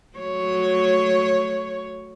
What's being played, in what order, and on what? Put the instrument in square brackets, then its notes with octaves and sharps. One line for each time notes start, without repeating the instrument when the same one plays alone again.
[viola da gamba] F#3 A3 C#5